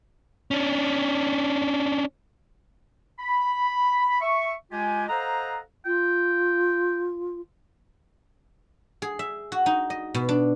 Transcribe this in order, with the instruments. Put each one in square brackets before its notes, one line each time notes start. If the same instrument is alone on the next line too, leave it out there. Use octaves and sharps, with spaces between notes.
[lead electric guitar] C#4 D4
[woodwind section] B5
E5 C#6
G#3 F4 G4 G#5
A4 C5 D#5 F5 F#5 A#5
[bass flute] F4 [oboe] G5
[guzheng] G#4
E5
F#4
D#4
D#5
B2
D4